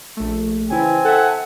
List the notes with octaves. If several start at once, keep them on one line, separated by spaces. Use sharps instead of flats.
A#1 A3
C#3 E3 C4 E4 G#5
A4 E5 F#5